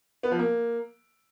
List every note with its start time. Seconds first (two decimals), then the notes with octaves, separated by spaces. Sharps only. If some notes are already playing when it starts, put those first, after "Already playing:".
0.23 B3
0.31 F3
0.39 A#3